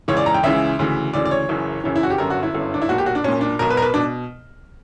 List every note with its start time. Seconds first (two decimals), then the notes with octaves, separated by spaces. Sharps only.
0.08 C#2 C#3 E3 C#5
0.17 D5
0.26 A#5
0.34 G5
0.43 C#2 C#3 E3 E5
0.79 D2 C#3 E3
1.13 D2 C#3 E3 D5
1.25 D5
1.31 C#5
1.49 F#1 F#2 C#3 E3
1.84 F#1 F#2 C#3 E3
1.96 E4
2.03 F#4
2.10 G4
2.18 G1 F#2 D3 A#4
2.30 F#4
2.43 E4
2.54 G1 F#2 D3
2.74 D4
2.82 E4
2.89 B1 A#2 F#4
2.98 G4
3.06 F#4
3.15 D4
3.24 B1 A#2 C#4
3.41 D4
3.59 B1 B2 A#4
3.70 B4
3.77 A#4
3.82 B4
3.94 B2 D4